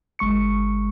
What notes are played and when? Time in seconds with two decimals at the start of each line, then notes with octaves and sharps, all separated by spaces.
0.19 G1 G#3 C#6 C#7